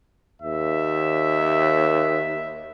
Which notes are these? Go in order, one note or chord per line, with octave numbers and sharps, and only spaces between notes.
D#2 E5